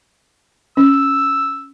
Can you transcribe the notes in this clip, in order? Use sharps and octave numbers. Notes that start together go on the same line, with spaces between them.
C#4 E6